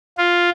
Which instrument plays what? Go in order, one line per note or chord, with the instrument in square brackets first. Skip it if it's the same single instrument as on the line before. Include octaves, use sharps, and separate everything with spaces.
[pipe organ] F4